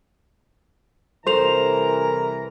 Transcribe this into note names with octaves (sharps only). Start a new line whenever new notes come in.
C2 E3 A4 A#4 C5 A#5 F7